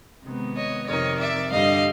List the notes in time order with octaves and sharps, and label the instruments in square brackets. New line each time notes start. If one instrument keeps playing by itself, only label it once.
[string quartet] C3 D#3 G#3 B3
C#5 D#5
F2 C3 D#3 C#5 D#5
D5 E5
G2 D3 G3 D#5 F5